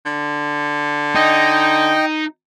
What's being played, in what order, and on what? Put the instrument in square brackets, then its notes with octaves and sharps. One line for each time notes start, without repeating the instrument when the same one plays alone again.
[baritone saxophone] D3
[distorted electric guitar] D#4 [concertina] D#5 G5